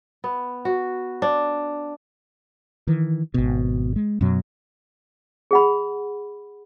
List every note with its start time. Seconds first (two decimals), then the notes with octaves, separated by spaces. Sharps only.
0.24 B3
0.65 F#4
1.22 D4
2.87 D#3 E3
3.34 G#1 B2
3.96 G#3
4.21 F#2 B2 F#3
5.51 G#4 F#5 B5